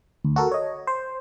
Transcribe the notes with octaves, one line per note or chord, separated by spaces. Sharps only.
D2
F#4 A4 A#4
C#5 D#5
C5